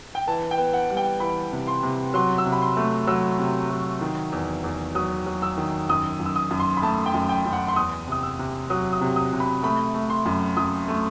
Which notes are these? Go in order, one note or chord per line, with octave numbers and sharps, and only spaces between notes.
G5
E3 A5
G5
B3
F#5
G3
G5
E3 B5
C3
C6
C3
F#3 C6
E6
C3
B5
C6
A3
F#3 E6
C3
F#3
D#3
E2
E2
F#3 D#6
F#3
E6
D#3
F#2 D#6
F#2
E6
D#6
F#2
C6
B5
A3 A5
G5
F#2
G5
F#2
F#5
C6
E2 D#6
C3 D#6
E6
C3
F#3 D#6
D#6
C3
D#6
C3
B5
A3 B5
A3
C6
F#2
F#2 D#6
A3